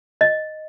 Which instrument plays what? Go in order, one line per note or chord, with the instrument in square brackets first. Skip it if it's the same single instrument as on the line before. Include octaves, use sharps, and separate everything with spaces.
[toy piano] D#5